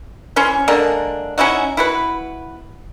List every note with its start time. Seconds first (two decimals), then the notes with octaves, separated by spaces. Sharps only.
0.36 E3 C#4 C5 C#6
0.68 D3 G#3 A#3 D4
1.38 C#4 D#4 E4 F#4
1.77 E4 F#4 B4